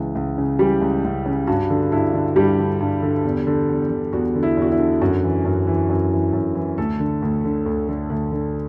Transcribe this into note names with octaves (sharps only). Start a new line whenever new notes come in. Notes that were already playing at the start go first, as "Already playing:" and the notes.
Already playing: C#2 E3
C#2
C#3
E3 G3 G4
C#2
C#2
C#3
G2 F#4
D3
G2 E4
D3
G2 G3 G4
D3
G2
D3
E2
D3
E2
D3
E2 F#4
D3
E4
E2
F#4
E4
D3
F#2 F#4
E3
F#2
E3
F#2
E3
F#2
E3
D2 A3 A4
D3
D2
D3
D2
D3
D2
D3